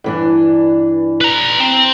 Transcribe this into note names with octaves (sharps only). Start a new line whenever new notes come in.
G2 E3 D4
B4 A#5
C4